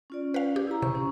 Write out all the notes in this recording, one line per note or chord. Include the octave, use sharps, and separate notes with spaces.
C#4 F4 D5
B4 F5
G4
E4 A#5
C3 C#6
C#4